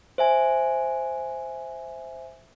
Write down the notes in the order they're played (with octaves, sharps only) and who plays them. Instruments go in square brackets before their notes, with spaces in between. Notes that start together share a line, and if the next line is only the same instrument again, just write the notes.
[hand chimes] C5 E5 G#5